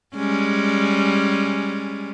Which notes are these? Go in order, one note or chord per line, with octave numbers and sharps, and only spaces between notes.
G3 G#3 C#4